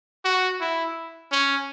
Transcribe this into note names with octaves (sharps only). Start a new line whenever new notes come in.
F#4
E4
C#4